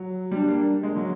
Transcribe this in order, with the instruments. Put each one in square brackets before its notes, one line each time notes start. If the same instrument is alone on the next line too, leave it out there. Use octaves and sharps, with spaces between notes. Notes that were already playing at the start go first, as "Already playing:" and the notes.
Already playing: [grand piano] F#3
[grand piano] G3 [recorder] D4
[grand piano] A#3
G#3
F#3